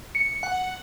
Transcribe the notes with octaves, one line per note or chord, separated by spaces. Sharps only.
C#7
F#5